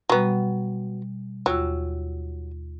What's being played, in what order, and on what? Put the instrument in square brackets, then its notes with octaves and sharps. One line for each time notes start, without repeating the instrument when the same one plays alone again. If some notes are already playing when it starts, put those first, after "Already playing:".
[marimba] B2 G3 [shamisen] F#3 B3
[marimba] D#2 F4 E6 [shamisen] F#3